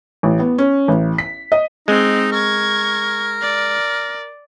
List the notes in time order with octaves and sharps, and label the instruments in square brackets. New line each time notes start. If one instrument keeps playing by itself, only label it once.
[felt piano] A1
B3
C#4
A1
B6
D#5
[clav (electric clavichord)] G#3 [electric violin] C4 [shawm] D#4
[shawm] A#4 [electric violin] C#6 G#6
[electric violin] D5